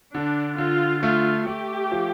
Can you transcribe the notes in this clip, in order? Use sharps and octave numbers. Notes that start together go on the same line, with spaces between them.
D3 D4
D3 F4
A3 F4
A3 G4
F3